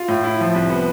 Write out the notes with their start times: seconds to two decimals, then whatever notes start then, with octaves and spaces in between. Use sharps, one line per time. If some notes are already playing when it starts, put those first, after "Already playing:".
Already playing: F4
0.08 A2
0.24 E4
0.40 F3
0.55 C2
0.70 B3